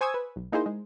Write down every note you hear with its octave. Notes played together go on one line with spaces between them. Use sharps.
C5 G#5 C#6 D#6 E6 G#6
B4
B1
A#3 D#4 E4 G#4 C5
G#3